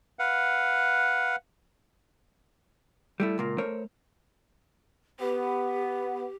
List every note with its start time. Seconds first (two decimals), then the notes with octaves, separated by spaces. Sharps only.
0.19 B4 F5 F#5
3.20 G3 A3 E4
3.38 C#2 A#2 A#3
3.58 A3 A#4 C5 C#5
5.20 B3 G4